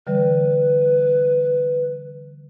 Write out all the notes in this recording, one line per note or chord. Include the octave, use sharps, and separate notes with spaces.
D3 E3 G3 B4